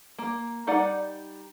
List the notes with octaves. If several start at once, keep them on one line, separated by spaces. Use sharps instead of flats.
A#3
G3 D#4 D5 F#5